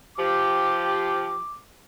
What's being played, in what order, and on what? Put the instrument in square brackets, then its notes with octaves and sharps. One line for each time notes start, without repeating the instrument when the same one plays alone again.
[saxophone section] F3 G4 [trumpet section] D6